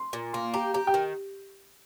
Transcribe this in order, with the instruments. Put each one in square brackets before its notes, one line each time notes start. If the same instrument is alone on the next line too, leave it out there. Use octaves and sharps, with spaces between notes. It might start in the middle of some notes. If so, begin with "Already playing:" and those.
Already playing: [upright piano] C6
[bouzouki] A#2
[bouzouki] A#3 [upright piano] C6
[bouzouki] G4 [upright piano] A#5
[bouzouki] G4 [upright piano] A#5
[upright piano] G5
[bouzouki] D#3